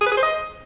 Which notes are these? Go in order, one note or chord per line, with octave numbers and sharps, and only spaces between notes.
G#4
B4
G#4
C5
D#5